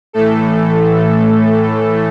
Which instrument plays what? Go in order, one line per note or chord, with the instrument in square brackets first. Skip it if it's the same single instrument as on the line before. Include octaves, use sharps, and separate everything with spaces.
[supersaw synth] A2 E3 A3 A4